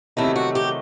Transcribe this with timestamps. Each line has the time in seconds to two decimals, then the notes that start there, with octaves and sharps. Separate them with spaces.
0.17 E2 C3 D#3 F#3 A3 E4
0.36 F#4
0.55 G4